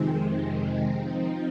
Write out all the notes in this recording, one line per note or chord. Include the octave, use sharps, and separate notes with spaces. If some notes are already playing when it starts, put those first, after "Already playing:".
Already playing: F2 C3 D#3 G#3 C4
F3 C4 D#4